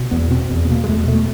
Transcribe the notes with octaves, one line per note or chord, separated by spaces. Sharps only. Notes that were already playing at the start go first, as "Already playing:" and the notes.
Already playing: B2
E2 B3
B2 C4
E2
B3
B2 A#3
G#3
E2 A3
G#3
B2 A3